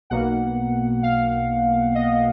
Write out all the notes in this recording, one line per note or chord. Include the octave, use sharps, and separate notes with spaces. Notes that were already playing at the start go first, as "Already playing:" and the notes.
B1 B2 A#3 F#5
F5
D#5